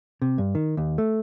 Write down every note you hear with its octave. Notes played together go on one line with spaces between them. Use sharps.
C3
G2
D#3
D#2
A3